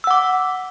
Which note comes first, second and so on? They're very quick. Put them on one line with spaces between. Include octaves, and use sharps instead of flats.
E6 F#5 D6